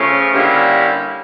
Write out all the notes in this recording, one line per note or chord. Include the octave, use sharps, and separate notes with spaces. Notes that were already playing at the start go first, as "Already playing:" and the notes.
Already playing: C#3 F3 A3 C#4
D3 G3 A#3 C#4 E4